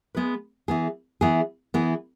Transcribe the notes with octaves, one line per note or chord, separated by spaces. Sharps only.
G#3 B3 G#4 B4
E3 B3 G#4
E3 B3 G#4
E3 B3 G#4